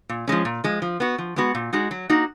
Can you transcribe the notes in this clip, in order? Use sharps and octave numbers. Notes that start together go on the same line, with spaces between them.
A#2
F3 G#3 C#4
A#2
F3 G#3
F3
B3 F#4
F3
G#3 B3 F#4
A#2
G#3 D#4 F#4
F#3
A#3 D#4 F#4